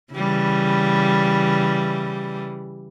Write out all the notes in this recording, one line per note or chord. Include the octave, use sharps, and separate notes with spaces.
C#3 E3 G3